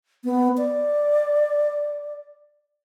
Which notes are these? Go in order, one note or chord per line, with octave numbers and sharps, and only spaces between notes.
B3
D5